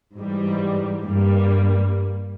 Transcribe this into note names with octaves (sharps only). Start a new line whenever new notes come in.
G#2 E3 G3
G2 G3 A#3